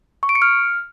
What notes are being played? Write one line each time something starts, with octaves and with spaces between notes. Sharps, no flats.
C#6
D7
C#7
F6